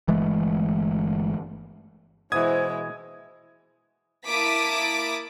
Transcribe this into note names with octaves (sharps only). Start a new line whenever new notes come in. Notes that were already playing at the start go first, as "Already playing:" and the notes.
G1 E3 G#3 A3
B2 E3 G#3 E4 C5 D#6 G#6
A#3 E4 A5 D6 D#6 B6